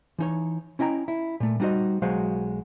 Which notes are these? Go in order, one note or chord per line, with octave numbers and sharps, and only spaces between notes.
E3 D#4 C#5
C#4 E4 D#5 G5 A#5
E4
A#2 A3
G3 B3 D#4 F#4 C5 D#5
B1 F#3 G#3 F#4 C5 F5